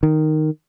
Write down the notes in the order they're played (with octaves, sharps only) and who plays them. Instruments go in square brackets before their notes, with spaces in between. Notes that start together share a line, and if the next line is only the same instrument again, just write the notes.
[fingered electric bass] D#3